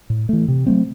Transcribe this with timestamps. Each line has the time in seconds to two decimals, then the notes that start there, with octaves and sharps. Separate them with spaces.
0.10 A2
0.29 E3 A3
0.48 C3
0.66 F#3 A3 C4